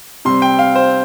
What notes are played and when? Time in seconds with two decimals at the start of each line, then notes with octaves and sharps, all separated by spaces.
0.25 C3 G3 C4 C6
0.42 G5
0.59 F5
0.75 C5